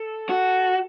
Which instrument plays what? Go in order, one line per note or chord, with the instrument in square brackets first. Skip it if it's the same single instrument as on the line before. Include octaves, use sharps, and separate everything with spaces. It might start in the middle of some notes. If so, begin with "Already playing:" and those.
Already playing: [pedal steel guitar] A4
[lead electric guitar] F#4